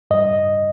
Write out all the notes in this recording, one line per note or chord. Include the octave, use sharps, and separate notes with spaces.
G2 D#5